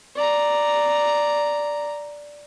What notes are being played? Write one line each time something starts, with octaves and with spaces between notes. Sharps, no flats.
D5 A#5